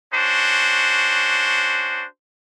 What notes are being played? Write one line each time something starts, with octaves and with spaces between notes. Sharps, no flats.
C#4 D4 F#4 C5